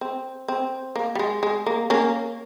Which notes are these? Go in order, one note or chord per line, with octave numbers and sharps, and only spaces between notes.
C4
C4
A#3
G3
G#3
G#3
A#3
A#3 C#4